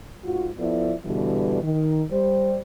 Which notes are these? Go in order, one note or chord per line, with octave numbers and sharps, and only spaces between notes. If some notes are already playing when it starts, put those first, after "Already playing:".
G#2 F4 F#4
F3 B3 E4 A4 D5
B2 D3 E3 G3
D#3
G3 C5